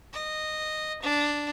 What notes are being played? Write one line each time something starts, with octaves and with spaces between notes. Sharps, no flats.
D#5
D4